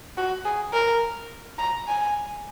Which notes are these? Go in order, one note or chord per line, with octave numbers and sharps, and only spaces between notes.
F#4
G#4
A#4
A#5
G#5